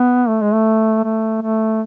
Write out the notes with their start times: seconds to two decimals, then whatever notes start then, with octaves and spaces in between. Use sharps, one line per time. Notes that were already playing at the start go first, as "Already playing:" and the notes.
Already playing: B3
0.28 A3
0.41 G#3
0.54 A3
1.04 A3
1.42 A3